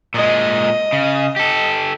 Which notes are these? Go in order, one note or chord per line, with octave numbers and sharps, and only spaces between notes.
A#2 G#3 D#5
C#3
G4 A4